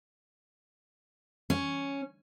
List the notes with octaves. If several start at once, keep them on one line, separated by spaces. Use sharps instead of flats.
C#4